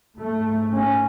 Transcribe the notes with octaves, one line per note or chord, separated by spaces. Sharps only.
G#2 A3
C#4